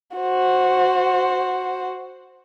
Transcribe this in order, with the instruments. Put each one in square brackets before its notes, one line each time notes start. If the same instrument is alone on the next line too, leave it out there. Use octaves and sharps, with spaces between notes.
[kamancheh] F#4 C5